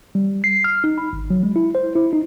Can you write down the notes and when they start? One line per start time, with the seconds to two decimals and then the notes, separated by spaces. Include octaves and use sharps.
0.15 G3
0.44 C7
0.64 F6
0.84 D#4
0.98 B5
1.13 G#1
1.30 F#3
1.43 G#3
1.56 E4
1.75 C5
1.95 E4
2.13 D#4